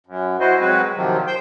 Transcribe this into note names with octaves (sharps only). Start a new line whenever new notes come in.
F#2
E4 F#4 C5 D#5
F#3 G#3 C4 F#4 B4
C3 D#3 F3 F#3
C5 G5 G6